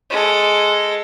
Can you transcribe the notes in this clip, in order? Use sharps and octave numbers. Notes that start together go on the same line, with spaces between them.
G#3 A4